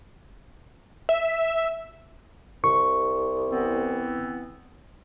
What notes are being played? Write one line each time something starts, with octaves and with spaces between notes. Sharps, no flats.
E5
C2 C#6
E3 B3 C4